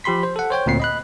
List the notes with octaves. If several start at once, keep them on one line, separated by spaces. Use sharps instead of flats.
F3 G4 B5 C6 B6
C5
A4 F#5
C5 C#5 G5 G6
D2 A#2 C4 C7
D#5 B5 F#6